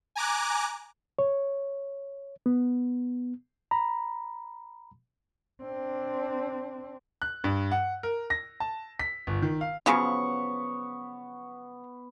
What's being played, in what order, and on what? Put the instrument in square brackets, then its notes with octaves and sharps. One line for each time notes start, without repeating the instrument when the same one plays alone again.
[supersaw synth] G#5 A#5 D6 F#6
[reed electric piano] C#5
B3
A#5 B5
[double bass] C4 D4
[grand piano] F#6
G2
F#5
A#4
A#6
A5
B6
G1
D#3
F5
[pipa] C#3 F3 F#3 [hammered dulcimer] B3 C#6